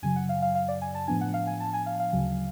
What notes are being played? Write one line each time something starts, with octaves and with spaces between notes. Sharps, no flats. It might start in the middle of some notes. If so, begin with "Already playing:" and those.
F#2 C#3 F#3 G#5
F#5
F5
F5
F5
D5
G#5
A5
A2 F3 B3 D4 G#5
F#5
F5
G#5
A5
G#5
F5
F5
D2 C#3 F#3